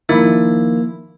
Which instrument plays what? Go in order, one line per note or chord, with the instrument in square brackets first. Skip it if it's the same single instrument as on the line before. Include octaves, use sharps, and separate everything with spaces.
[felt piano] D#3 F3 [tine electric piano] A#3 [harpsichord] E4